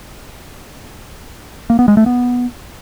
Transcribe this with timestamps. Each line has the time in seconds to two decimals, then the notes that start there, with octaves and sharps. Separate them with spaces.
1.70 A#3
1.79 B3
1.88 G#3
1.97 A3
2.06 B3